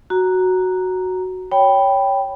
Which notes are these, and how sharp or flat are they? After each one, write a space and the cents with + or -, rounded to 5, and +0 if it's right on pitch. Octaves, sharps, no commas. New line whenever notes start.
F#4 +0 A#5 +0
C#5 +10 G5 +0 B5 +0